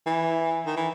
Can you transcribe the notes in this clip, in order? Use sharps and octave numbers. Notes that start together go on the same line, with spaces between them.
E3
D#3
E3